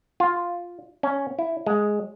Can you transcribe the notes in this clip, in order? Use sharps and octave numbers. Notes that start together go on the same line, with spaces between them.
F4
C#4
E4
G#3